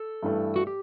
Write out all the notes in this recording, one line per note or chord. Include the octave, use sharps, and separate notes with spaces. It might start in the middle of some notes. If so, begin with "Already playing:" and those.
Already playing: A4
G2 E3 A3
F#4
G4